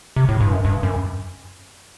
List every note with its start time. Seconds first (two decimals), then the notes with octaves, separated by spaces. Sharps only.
0.16 C3
0.29 A2
0.41 G2
0.52 F#2
0.65 G2
0.83 F#2